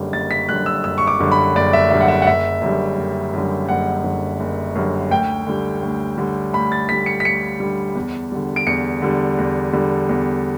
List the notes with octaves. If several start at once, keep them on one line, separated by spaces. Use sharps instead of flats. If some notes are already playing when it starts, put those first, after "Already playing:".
Already playing: F#1 F#2 D3 G3
F#1 A6
B6
F#2 D3 G3 F#6
E6
F#1 E6
C#6
D6
F#2 D3 G3
B5
F#1 D5
E5
F#2 D3 G3 E5
F#5
E5
F#5
F#1 E5
F#2 D3 G3
F#1
F#2 D3 G3
F#1 F#5
F#2 D3 G3
F#1
F#2 D3 G3
D2 G5
D3 G3
D2
D3 G3
D2 B5
A6
D3 G3 B6
C#7
B6
D2 C#7
D3 G3
E2
D3 G3
D7
E2 C#7
D3 G3
E2
D3 G3
E2